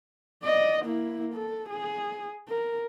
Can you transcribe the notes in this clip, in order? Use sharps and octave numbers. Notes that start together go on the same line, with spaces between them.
D5 D#5
A#3 E4
A4
G#4
A#4